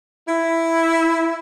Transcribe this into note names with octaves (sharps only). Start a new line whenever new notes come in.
E4